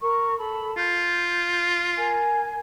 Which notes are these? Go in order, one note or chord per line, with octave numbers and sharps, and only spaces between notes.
A#4 C#6
A4 B5
F4 G6
A#4 G#5